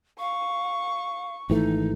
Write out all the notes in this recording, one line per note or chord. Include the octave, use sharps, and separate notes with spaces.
F5 C#6
G#1 E3 A3 D#4